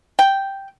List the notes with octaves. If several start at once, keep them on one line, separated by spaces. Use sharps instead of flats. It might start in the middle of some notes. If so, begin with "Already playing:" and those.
G5